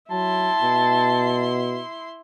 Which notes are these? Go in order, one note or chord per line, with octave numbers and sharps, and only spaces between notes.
F#3 E4 A5 C6
B2